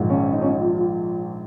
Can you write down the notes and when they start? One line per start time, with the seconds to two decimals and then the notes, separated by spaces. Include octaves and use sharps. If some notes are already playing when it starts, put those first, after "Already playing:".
Already playing: A#1 G#2 D#3
0.10 C#4
0.32 D#4
0.42 C#4
0.46 D#4
0.60 F4
0.75 F4